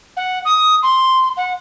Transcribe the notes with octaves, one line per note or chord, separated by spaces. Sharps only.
F#5
D#6
C6
F#5